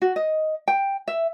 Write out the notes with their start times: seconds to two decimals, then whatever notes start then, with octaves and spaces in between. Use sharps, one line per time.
0.02 F#4
0.16 D#5
0.68 G5
1.08 E5